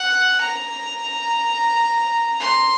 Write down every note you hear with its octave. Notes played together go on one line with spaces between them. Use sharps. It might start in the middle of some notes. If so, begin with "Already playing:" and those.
Already playing: F#5
A#5
C6